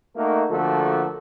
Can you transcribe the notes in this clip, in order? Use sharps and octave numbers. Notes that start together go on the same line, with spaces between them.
A3 A#3 D#4 F#4 A#4
D3 F3 A3 A#3 F#4 A4